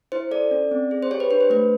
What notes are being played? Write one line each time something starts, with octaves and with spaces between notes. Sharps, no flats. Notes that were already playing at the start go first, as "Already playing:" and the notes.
E4 C5
A4 D5
C#4
C4
G#4
C5
G4 C#5
B4
D4 B4
C5
A3 B4